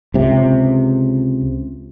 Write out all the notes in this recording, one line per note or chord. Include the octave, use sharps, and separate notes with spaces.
C#2 C3